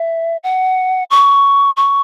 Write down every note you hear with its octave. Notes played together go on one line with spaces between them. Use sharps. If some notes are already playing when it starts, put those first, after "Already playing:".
Already playing: E5
F#5
C#6
C#6